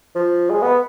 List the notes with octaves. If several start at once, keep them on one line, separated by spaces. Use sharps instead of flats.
F3
G#3
B3